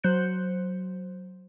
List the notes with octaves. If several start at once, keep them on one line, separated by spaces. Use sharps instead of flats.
F#3 C5 F#6 G6 C#7